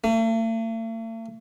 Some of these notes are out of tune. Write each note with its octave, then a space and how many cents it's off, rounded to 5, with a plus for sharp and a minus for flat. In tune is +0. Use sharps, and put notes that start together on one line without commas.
A3 +45